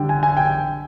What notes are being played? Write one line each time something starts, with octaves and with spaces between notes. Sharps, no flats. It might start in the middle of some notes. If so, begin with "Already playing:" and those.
Already playing: D3 G3 D4 G5
G#5
G#5
G5